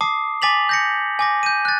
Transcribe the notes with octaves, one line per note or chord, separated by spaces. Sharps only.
A5 D6 D#6 C7
G#5 D6 A6 B6 F7 F#7
G6 A#6 C#7
G#5 D6 A#6
G6 D#7
F#6 A6